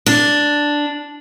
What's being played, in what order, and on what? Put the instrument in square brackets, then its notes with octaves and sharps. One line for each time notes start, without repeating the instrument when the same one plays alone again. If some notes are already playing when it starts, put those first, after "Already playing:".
[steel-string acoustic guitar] D4